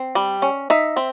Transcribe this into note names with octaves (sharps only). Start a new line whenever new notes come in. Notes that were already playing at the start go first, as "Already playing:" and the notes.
Already playing: C4
G3
C#4
D#4 E5
C4